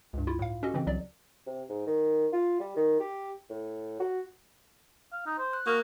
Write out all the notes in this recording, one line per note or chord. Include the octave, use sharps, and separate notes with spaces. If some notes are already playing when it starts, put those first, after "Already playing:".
C#2 G2
E4 F4
A2 F5
C#4 F#4 G4 A4 D#5
C#3 E3 C4
C2 F#3 D5
C3
G#2
D#3
F4
G3
D#3
G4
A2
F#4
F5
D#4
C5
F#6
A#3 F#4 D#6 F6 F#6